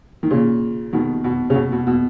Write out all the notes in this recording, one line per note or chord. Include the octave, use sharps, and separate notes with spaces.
D#3
A#2 C#3
B2 D#3
B2
C#3
B2
B2
B2